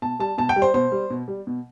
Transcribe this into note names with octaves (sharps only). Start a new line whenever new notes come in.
B2 A5
G3 A5
B2 A5
G5
G3
C5
B2 C5
G3
B2
G3
B2